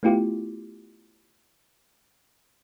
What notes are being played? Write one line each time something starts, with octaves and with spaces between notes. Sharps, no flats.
A3 B3 E4 F4 G4